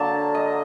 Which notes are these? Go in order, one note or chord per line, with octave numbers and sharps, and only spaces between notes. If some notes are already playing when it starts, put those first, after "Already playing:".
Already playing: D3 F#3 A#3 A5
D#5